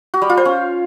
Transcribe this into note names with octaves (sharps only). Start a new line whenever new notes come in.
F#4
G3
F4
C5
C#4